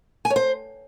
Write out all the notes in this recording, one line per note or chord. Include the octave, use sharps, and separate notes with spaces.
G#5
C#5
C5